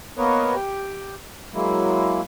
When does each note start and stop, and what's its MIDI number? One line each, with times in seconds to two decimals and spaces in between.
0.18 0.55 58
0.18 0.55 59
0.18 0.55 70
0.18 0.55 71
0.18 0.55 73
0.18 0.55 75
0.55 1.15 67
0.55 1.15 79
1.54 2.21 54
1.54 2.21 56
1.54 2.21 58
1.54 2.21 64